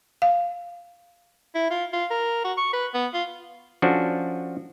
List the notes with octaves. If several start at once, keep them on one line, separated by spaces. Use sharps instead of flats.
F5
E4
F4
F4
A#4
F#4
C#6
B4
B3
F4
F3 C#4 D4 F#4 A4